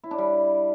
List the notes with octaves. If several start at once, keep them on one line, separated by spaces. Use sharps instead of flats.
E4
D4
G3